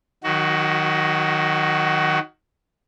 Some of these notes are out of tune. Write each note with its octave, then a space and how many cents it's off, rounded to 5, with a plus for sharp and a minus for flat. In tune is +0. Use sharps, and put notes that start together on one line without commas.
D#3 +0 F#3 -20 F#4 +20